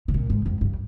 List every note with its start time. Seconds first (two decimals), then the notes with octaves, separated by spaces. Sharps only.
0.08 C3
0.14 A#2
0.30 G#2
0.46 F2
0.61 G2